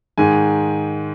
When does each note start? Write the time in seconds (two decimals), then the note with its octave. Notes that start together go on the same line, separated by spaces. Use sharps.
0.18 G#2 D#3 G#3 G#5